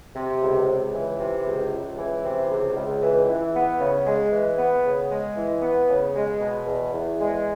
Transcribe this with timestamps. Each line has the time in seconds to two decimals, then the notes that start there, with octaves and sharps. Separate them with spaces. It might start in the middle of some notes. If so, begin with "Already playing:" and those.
0.15 C3
0.42 C#2
0.68 C#2
0.94 E3
1.19 C3
1.46 C#2
1.72 C#2
1.97 E3
2.23 C3
2.51 C#2
2.77 C#2
3.02 E3
3.29 E3
3.55 B3
3.80 C#3
4.06 G#3
4.32 E3
4.58 B3
4.85 C#3
5.11 G#3
5.36 E3
5.62 B3
5.89 C#3
6.15 G#3
6.41 B2
6.66 E2
6.93 E2
7.19 G#3